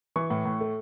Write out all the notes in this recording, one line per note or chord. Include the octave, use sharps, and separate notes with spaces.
E3 C#6
A2
A2
A3